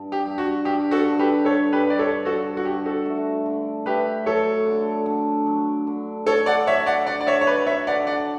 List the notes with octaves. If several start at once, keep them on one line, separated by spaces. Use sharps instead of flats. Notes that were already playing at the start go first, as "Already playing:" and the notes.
Already playing: G2
G4
G2
F#4
G2 G4
F#4 A4
D3
G4 B4
G2 A4 C#5
G4 B4
G2
D5
A4 C#5
G2 F#4 A4
F#4
G2 G4
F#4 A4
A3
D3
A3 G4 B4
F#3 A4 C#5
D3
D3
F#3
D3
D3 A4 C#5
D5 F#5
F#3 C#5 E5
D5 F#5
D3 D5 F#5
D5
C#5 E5
C#5
F#3 B4 D5
C#5 E5
D3 D5 F#5
D5 F#5